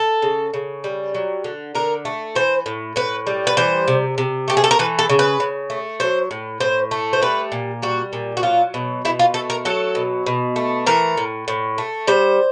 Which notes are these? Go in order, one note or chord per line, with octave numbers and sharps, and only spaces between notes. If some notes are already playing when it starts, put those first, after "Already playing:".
Already playing: A4
C#3
C#3
G3
F#3
D3
D3 A#4
A3
E3 C5
A2
A2 B4
G3
B4
E3 C5
C3
C3
A3 G4
G#4
A4
A#4
E3 B4
A4
C#3
B4
C#3
A3
F#3 C5
A2
A2 C5
A3
C5
G3 B4
A#2
G3 F#4
A#2
F#4
F#3 F4
B2
B2 E4
F4
A3 A4
A#4
F#3 A4
B2
B2
A3
E3 A#4
A2
A2
A3
G3 C5